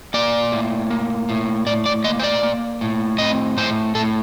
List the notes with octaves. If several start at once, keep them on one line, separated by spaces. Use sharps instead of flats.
A#3 D5
A2
A#3
A2
A2 D5
D5
A#3 D#5
C5
D5
A#3
A2
C4 D#5
A2 C5
A2 A4